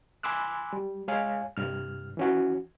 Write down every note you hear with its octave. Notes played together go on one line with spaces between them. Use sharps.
G#5 B5 C6 D6 E6 F#6
G3
G#3 C#5 F5 G#5
C2 G2 F6
E3 C#4 F#4